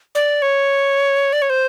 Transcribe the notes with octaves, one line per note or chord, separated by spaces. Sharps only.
D5
C#5
D5
C#5
C5